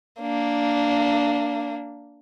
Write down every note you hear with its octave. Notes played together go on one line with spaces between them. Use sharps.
A#3 D4